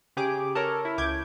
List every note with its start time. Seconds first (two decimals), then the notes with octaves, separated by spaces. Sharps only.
0.17 C#3 G4 G#4 D6
0.55 A4 A#4 C#5
0.85 E4
0.98 C#2 D6 G6 G#6